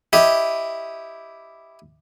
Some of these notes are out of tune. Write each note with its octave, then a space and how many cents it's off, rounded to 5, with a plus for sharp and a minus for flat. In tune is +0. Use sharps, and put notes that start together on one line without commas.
E4 +0 G4 +0 D#5 +0